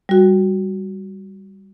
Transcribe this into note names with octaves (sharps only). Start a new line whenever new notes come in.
G3 F#4